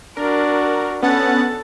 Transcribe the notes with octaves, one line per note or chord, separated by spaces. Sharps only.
D4 F#4 A#4
B3 C#4 A4 F#5 A5